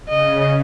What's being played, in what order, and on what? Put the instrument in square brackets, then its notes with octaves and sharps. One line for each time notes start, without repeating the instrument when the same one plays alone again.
[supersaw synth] C#3 [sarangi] D#5